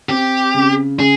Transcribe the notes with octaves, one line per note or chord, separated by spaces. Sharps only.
C4 G4
C#3
C#3 G#4